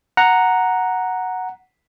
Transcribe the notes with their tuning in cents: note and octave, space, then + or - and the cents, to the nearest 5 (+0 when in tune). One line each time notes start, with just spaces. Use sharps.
F#5 -5 A#5 +0